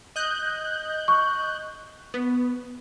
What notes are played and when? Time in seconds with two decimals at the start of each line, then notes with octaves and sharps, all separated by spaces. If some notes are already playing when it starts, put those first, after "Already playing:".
0.16 D#5 F#6 G6
1.08 C#6
2.14 B3